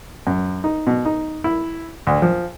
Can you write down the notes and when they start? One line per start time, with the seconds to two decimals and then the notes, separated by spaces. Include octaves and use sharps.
0.27 F#2
0.64 D#4
0.87 B2
1.05 D#4
1.44 E4
2.07 D2
2.22 F3